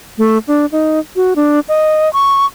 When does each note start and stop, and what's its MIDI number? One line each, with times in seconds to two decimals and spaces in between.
0.18 0.38 57
0.48 0.66 62
0.72 0.99 63
1.16 1.34 66
1.36 1.60 62
1.68 2.11 75
2.13 2.46 85